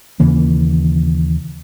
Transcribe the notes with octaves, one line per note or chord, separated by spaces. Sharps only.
D#2 C#3 E3 A#3